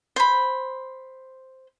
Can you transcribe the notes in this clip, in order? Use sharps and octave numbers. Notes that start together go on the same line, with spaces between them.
C5 B5